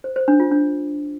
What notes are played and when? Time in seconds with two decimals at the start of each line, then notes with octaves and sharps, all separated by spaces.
0.04 C5
0.16 C5
0.28 D4
0.40 F4
0.51 D4